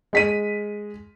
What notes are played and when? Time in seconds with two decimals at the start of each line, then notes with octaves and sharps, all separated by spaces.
0.13 G#3 B6 D#7